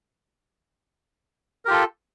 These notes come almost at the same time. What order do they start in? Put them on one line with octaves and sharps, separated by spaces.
A#4 G4 F4 A4